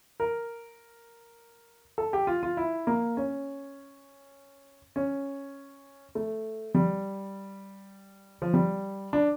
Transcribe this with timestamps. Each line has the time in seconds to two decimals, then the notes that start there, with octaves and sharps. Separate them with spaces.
0.20 A#4
1.98 A4
2.13 G4
2.27 F4
2.43 F4
2.57 E4
2.87 A#3
3.17 C#4
4.96 C#4
6.15 A3
6.75 G3
8.42 F3
8.54 G3
9.13 D4